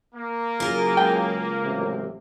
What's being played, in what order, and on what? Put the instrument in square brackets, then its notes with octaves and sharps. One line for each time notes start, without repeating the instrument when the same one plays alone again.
[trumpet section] A#3
[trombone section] F#2 C#3 G#4 [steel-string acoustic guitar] F4 A#4
[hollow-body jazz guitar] C#2 G5
[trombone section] A1 F#2 C3